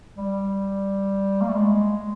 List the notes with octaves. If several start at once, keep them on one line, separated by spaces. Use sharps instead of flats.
G3
A#3
A3
G#3